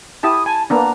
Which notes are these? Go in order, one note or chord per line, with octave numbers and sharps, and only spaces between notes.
E4 G4 A5 D#6
G#5 A5
A#3 B3 D4 A#5